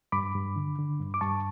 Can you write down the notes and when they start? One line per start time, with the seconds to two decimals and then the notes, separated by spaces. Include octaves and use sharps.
0.12 G2 B5 D6
0.35 G2
0.56 D3
0.78 D3
1.00 G2
1.14 D6
1.21 G2 A5 C#6